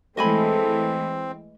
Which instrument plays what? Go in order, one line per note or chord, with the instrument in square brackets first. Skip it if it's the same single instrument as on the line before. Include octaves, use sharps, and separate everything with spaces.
[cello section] E3 G#3 A3 [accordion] C4 [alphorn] A4 [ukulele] D#5 G#5 B5